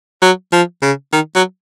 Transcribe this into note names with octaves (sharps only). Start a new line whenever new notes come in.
F#3
F3
C#3
D#3
F#3